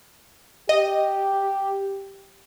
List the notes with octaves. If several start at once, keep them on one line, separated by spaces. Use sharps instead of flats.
G4 D#5